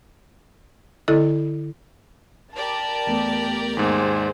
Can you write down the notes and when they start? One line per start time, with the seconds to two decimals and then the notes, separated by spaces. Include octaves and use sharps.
1.08 D3 E4 A4 D#5
2.55 G4 A#4 D5 A5
3.07 E2 A3 B3
3.77 D#2 G#2 G#4 C5